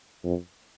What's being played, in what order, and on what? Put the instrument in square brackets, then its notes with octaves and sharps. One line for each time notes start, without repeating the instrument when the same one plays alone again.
[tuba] F2